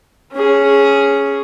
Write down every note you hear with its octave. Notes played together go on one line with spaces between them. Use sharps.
C#4 G#4